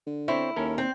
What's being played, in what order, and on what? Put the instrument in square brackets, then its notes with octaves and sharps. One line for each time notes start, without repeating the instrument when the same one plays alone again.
[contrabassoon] D3
[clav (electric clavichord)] C4 C5 C#5 [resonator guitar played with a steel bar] E4
[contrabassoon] D#2 [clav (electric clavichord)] C#4 A4 A#4
[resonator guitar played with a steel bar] C4